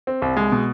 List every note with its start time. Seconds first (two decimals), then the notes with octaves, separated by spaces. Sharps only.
0.07 C4
0.22 C2
0.37 G#3
0.52 B2